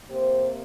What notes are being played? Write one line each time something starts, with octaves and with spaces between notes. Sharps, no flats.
C3 A#3 G4 C5